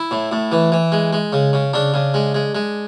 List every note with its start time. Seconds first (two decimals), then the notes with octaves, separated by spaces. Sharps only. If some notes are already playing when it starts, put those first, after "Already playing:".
Already playing: E4
0.11 A2
0.32 A2
0.52 E3
0.72 E3
0.92 G#3
1.13 G#3
1.33 C#3
1.53 C#3
1.73 C#3 D4
1.94 C#3
2.14 G#3
2.34 G#3
2.55 G#3